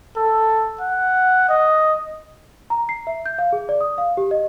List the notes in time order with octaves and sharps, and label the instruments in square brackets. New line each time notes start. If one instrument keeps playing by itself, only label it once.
[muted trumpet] A4
F#5
D#5
[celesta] A#5
C7
E5
G6
F5
G#4
D5
D#6
F5
G4
D#5